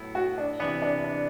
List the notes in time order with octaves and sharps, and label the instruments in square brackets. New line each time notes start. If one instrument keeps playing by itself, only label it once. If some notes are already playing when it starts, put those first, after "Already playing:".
Already playing: [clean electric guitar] A2 F#3 B3 E4
[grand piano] F#4
D4
[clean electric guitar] C3 E3 B3 [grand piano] D4
[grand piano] D4
D4